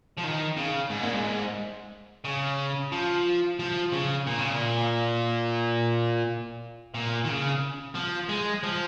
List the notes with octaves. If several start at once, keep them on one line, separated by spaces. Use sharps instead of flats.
F3
D#3
C#3
G#2
A#2
G#2
C#3
F3
F3
C#3
A#2
C#3
A#2
A#2
D#3
C#3
F3
G#3
F3